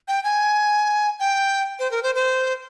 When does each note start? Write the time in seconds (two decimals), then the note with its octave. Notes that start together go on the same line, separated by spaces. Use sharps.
0.08 G5
0.24 G#5
1.20 G5
1.79 C5
1.91 A#4
2.03 C5
2.15 C5